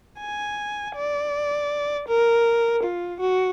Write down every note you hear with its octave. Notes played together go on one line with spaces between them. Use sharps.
G#5
D5
A#4
F4
F#4